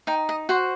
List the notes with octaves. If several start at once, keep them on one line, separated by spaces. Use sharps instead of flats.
D#4 G5
D#5
F#4 C5 F#5